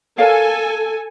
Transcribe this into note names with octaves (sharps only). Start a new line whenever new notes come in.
A4 A#4 C#5 F5 G#5